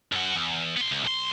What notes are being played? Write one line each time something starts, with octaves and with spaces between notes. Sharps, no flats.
F#2 F#4
E2
B3 C6
C#2
B1 C6